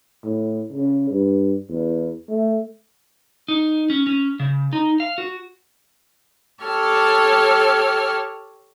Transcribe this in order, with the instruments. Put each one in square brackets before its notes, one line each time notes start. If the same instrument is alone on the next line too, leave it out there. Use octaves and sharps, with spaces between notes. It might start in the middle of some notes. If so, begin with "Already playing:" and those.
[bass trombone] A2
C#3
G2
E2
A3
[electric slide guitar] D#4
C#4
C#4
C#3
D#4
F5
F#4
[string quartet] G4 A4 C#5 A5 F6